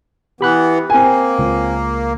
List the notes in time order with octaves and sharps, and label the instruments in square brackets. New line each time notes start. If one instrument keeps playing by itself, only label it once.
[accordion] E3 B3 [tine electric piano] G4 B5 F#6
[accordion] A#3 [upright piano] C4 G#5
[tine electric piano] C#2